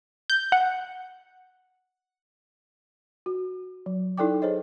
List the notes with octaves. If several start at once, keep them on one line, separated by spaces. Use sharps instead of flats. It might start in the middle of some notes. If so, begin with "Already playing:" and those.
G6
F#5
F#4
F#3
D#4 E4 A4 D5 G5 D6
G#4 C5 C#5 D#5